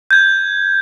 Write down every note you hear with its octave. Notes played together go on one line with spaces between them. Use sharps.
G6 G#6